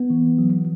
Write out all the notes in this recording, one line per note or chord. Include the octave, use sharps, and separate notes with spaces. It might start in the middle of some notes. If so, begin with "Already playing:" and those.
Already playing: B3
E3
F#3